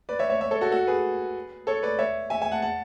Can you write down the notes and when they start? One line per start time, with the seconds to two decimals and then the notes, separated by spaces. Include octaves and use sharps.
0.09 B4 D5
0.19 C#5 E5
0.30 C#5 E5
0.41 C#5 E5
0.51 A4 C#5
0.61 F#4 A4
0.72 F#4 A4
0.87 G#4 B4
1.67 A4 C#5
1.83 B4 D5
1.99 C#5 E5
2.30 E5 G#5
2.42 E5 G#5
2.52 F#5 A5
2.62 F#5 A5